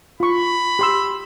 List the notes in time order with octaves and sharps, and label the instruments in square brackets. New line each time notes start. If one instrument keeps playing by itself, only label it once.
[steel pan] F4 C#6 [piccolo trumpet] B5
[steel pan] G4 C6 E6